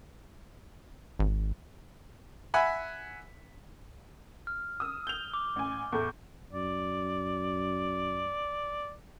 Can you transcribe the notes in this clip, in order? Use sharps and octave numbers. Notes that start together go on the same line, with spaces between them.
G#1
E5 F#5 G#5 B5
F6
D#6 E6
G6 F7 G7
D6
A1 G#5
E2 A2 A3 C#6 G6
F#2 D5